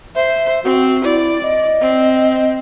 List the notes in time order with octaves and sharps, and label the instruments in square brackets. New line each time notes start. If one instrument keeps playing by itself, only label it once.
[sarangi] C5 [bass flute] E5
[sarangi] C4 [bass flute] F#4
[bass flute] E4 [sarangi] D5
[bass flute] D#5
[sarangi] C4